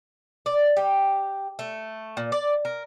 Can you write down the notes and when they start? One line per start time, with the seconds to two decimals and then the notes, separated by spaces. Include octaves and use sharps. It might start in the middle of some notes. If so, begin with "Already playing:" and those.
0.46 D5
0.77 G4
1.59 A3
2.17 A#2
2.32 D5
2.65 A#4